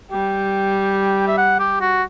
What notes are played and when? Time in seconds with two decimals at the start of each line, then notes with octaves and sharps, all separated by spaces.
0.11 G3 G5
1.28 E5
1.38 F#5
1.59 G4
1.81 F#4